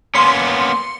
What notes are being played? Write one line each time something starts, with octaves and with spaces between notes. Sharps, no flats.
A#3 B3 C#4 C6 C#7